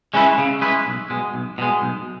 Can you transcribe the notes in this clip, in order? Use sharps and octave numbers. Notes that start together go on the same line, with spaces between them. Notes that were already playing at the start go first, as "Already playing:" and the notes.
G#3 C#4 E4 B4
C#3
G#3 C#4 E4 B4
B1
B2 G#3
B1
B2 G#3
B1